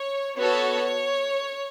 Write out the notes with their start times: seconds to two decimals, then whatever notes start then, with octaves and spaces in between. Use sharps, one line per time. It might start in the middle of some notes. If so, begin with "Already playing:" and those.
Already playing: C#5
0.37 B3 F#4 A4 C#5